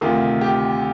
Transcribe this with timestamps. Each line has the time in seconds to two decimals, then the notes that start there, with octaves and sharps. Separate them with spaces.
0.01 D2 C3 D#3 F4
0.41 G4